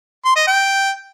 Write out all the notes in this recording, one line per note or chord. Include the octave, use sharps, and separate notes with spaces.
C6
D#5
G5